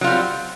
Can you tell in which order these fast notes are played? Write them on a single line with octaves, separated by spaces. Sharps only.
F#3 F4 G3 C4